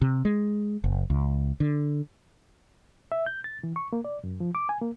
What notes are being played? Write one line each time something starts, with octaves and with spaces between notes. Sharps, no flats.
C3
G#3
F#1
C#2
D3
E5
G6
A6
E3
C#6
A#3
D5
F#2
F3
D6
G#5
A#3